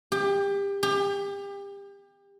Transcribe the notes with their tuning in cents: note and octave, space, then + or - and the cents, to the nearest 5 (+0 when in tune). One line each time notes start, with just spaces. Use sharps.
G4 +25
G4 +30